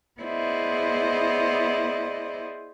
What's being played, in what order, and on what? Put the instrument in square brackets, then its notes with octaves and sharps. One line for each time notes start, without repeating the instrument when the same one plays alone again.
[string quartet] B3 E4 G#4 C5 D5 D#5